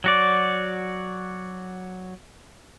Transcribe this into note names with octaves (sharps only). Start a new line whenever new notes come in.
F#3 F#4 D5